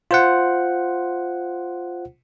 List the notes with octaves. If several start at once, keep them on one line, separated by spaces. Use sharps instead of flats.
F4 C5 F#5